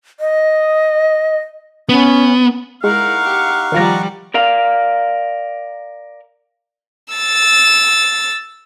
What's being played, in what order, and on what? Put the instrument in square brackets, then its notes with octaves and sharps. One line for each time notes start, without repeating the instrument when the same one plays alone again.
[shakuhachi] D#5
[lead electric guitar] B3 [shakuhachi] C#4
[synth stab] G#3 [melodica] D#4 F#5 C#6 [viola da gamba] E4 A#4 [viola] F5
[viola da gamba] G4
[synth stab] D#3 F4 A#5 [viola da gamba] F3 G3
[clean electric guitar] A#4 D5 F5
[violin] E6 A6